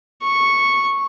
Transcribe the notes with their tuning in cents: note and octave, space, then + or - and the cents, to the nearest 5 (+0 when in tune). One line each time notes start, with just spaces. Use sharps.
C#6 -5